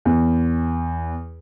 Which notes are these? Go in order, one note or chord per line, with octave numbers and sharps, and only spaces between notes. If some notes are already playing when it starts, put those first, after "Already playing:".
E2